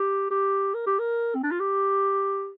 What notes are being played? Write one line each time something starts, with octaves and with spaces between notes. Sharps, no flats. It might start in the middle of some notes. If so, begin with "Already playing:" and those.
Already playing: G4
G4
A#4
G4
A#4
C4
D4
F4
G4